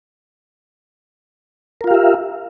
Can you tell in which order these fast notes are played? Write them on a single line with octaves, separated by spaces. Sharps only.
A#4 F4 F5 G4 E5